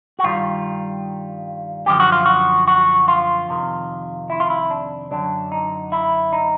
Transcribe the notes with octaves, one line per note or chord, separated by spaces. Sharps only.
F#4
G2 D#3 G3 F4
F#2 D3 F3 G4
F#4
F4
F#4
F#4
F4
F2 C3 D#3
E4
F4
E4
D4
F#2 D3 F#3 D4
D#4
E4
D#4